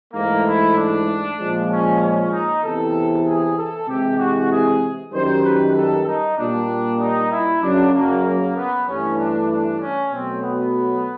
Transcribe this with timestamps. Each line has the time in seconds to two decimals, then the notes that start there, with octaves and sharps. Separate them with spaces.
0.13 G#2 E3 A3 A#3
0.45 E4
0.76 D4
1.39 A#2 F3 G#3
1.70 C#4
2.01 C#4
2.32 D#4
2.62 E2 C3 E3 A4
3.26 G#4
3.57 A4
3.87 C3 E3 G#3 G4
4.19 F#4
4.51 G#4
5.12 F#2 D#3 G3 C5
5.44 B4
5.75 A4
6.07 D#4
6.37 A#2 G3 D4
7.00 D#4
7.31 E4
7.62 F#2 C#3 F#3 D4
7.94 A#3
8.24 A#3
8.56 B3
8.87 G2 E3 A3 C#4
9.17 D4
9.50 D4
9.80 C#4
10.11 B2 F#3 A3 C4
10.42 B3